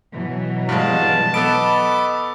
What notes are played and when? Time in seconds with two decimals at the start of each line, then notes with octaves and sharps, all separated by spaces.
0.13 B2 E3 F#3
0.69 G2 G#3 F5 F#5 A5
1.34 B3 A4 D#5 B5 D6 D7